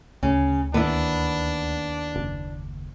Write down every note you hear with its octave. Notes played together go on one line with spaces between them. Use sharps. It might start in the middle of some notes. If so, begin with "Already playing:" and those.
D2 C#3
D#2 B3 D4 E4
F#1